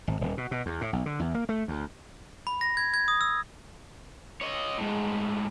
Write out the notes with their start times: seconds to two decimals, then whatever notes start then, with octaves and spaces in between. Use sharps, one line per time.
0.07 G#1
0.21 D#1
0.37 B2
0.51 B2
0.66 E2
0.81 A2
0.93 B1
1.06 D3
1.20 E2
1.34 A#3
1.49 A3
1.68 D2
2.47 B5
2.61 A#6
2.77 G#6
2.94 G#6
3.08 D#6
3.21 E6
4.41 C#5 D#5
4.78 A2 G#3